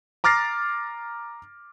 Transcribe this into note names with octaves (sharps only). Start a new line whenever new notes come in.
A#5 D6 F6 A6 A#6 C7